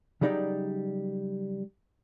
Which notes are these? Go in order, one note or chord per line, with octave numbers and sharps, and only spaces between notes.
C#3 F#3 G3 D#4 D5